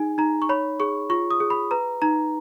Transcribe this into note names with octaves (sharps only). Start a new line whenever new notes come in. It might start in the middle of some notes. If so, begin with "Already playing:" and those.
Already playing: D#4 G#4 G#5
D#4 A#5
C#6
C#5 B5
G#4 C#6
F4 C#6
D#6
G#4
B5
B4 A#5
D#4 A#5